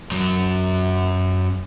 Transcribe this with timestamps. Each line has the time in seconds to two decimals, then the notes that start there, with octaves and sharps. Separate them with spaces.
0.11 F#2 F#3